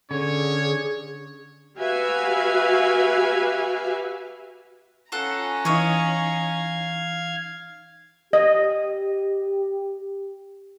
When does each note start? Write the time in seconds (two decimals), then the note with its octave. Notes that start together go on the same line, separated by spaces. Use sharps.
0.11 D3 C#4 G#4 C#5
1.79 F#4 G4 B4 E5 F5 G#5
5.12 C#4 F4 A4 F#5 A#5
5.65 E3 D#4 C#5 F5 D#6 G#6
8.33 G4 D#5